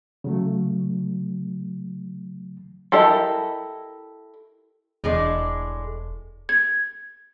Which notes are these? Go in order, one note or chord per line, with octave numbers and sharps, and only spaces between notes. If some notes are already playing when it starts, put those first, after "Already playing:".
C#3 F#3 A3
E4 G4 A4 A#4 D#5
E1 A2 G#3 D4
G#6